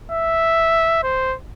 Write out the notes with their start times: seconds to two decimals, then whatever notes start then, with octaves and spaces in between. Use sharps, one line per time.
0.12 E5
1.03 C5